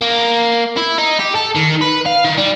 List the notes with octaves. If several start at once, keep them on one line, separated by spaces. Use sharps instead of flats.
A#3
E4
D#4
G4
A4
D#3
B4
F5
D#3
G3